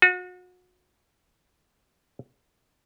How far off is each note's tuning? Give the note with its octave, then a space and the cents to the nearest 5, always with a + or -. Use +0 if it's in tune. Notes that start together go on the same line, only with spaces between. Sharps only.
F#4 -35